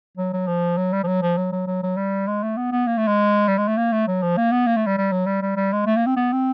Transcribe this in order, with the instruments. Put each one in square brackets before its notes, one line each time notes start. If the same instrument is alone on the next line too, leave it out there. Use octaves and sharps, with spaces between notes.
[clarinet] F#3
F#3
F3
F#3
G3
F3
F#3
F3
F#3
F#3
F#3
F#3
G3
G#3
A3
B3
B3
A#3
A3
G#3
G3
G#3
A3
A#3
A3
F#3
F3
A#3
B3
A#3
A3
G3
G3
F#3
G3
G3
G3
G#3
A3
A#3
C4
B3
C4